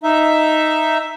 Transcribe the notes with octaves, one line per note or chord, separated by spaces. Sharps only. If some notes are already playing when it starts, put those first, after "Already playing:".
D#4 E5